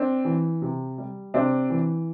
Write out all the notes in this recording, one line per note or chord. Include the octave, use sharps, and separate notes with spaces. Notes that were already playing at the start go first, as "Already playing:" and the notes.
Already playing: C4 D4
E3
C3
G3
C3 C4 D4
E3